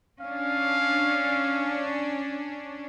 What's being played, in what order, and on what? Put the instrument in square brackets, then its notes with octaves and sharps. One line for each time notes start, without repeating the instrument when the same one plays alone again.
[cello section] C#4 D4 [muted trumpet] F5